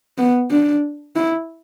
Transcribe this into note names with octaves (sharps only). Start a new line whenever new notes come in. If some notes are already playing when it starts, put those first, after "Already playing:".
B3
D4
E4